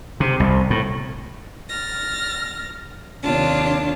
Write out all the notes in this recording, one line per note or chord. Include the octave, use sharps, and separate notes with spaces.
C3
C2
A2
F6 A6 A#6
D#2 C3 D4 F4 C#5 A5